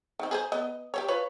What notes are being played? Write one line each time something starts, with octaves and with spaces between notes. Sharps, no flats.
D#3 C4
G#4 B4 C5
B3 D#5
G4 C5 C#5
F4 B4 C#5